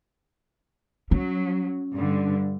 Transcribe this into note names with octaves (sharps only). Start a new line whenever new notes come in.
F#3 C#4
G2 D3